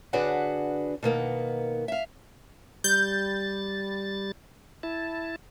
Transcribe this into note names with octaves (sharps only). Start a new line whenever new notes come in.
D3 D4 F#4 G#4 B4 F#5
B2 D#3 A#3 B3
E5 F5
G3 G6 A6
E4 A5